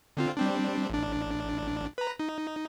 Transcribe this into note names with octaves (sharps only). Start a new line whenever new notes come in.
D3 C4 F4
G3 C4 D4
A1 D4
B4 A#5
D#4